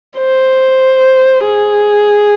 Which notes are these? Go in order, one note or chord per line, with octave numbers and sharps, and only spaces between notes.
C5
G#4